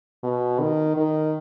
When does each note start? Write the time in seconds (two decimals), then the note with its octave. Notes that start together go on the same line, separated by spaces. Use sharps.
0.23 B2
0.60 D#3
0.97 D#3